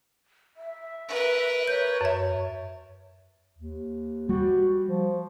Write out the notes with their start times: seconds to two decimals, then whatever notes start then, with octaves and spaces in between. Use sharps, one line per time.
0.57 E5
1.09 A#4 B4
1.68 C#5 G6
2.01 F#2 E5
3.58 D#2
4.29 G3 F#4
4.88 F3